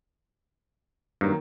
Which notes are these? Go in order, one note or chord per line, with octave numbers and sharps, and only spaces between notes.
G2 D#3 F#3 A#3